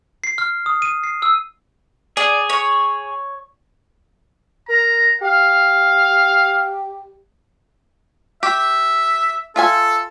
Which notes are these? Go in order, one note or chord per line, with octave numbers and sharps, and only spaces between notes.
C7
F6
D#6
D#7
C7
E6
G#4 D5
C#5
A#4 A#5
G4 F5
G4 E5
F4 A4 E5 G#5